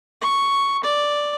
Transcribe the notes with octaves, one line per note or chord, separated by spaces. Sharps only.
C#6
D5